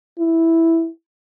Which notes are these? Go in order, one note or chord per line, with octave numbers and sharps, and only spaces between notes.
E4